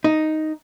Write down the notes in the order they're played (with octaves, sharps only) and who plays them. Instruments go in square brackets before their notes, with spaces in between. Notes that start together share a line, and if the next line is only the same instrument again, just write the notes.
[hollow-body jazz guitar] D#4